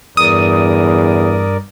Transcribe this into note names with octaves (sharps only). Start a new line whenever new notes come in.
E2 G2 A#4 D5 D#6